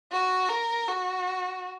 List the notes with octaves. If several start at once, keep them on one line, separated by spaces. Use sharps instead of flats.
F#4
A#4
F#4